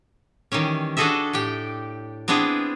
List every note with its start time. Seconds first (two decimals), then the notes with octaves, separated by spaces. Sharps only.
0.52 D#3 E3 G3 C#4
0.97 D4 F#4 G#4 A4 D#5 E5
1.33 A2 G4 G5
2.28 B3 C4 D4 E4 G#4